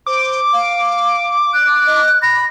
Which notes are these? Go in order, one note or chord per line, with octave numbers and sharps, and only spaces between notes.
C5 D6
F5
F#6
D#5
B5 A#6